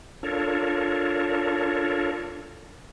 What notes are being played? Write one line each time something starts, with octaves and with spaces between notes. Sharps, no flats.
D4 F4 A4 A#4 C#5